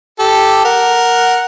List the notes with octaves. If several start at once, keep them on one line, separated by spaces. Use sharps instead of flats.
G4 A4
A#4 F#5